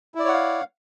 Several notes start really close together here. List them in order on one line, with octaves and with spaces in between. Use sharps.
E4 D5 C#5 F#5 F5